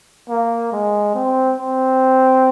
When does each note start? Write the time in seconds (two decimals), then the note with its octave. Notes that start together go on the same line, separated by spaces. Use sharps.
0.29 A#3
0.72 G#3
1.14 C4
1.58 C4